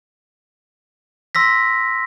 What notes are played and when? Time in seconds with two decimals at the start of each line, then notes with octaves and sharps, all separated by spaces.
1.35 C6 E6 A#6 B6